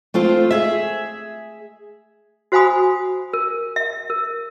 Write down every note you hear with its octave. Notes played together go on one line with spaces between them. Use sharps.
A3 C4 F4 C5
G#4 E5
F#4 C5 F5 G#5 B5 D#6
A#4
E5
A#4